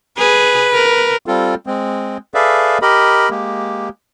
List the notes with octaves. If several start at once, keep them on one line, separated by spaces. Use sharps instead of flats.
G#4 B4
A#4
G3 C4 F4 A4
G#3 C4
G#4 A4 B4 D5 E5 F5
G4 A#4 D#5 B5
G#3 A#3 G4